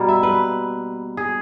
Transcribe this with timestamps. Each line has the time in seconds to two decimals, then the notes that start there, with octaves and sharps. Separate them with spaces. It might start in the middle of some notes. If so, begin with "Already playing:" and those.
Already playing: B2 G3 A#3
0.09 E5
0.23 B4
1.17 G#4